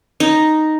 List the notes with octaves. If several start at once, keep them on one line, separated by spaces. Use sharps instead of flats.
D#4